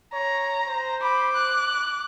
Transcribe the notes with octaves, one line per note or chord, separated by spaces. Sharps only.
C#5 A#5
C5
B5 D6
F#6